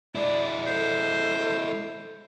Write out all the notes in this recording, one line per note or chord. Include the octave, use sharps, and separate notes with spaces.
G#3 E4 D5
A4 C5